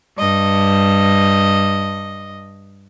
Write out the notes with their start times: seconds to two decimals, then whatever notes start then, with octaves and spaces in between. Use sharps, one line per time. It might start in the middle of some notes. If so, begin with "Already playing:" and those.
0.18 G2 D#5